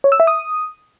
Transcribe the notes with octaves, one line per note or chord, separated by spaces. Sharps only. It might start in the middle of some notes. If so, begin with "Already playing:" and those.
C#5
E6
E5
D#6